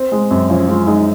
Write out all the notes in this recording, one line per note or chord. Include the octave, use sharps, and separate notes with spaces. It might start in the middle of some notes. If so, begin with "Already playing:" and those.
Already playing: C4
G#3
F#2 C4
F3 C#4
G#3 F4
G#3 D#4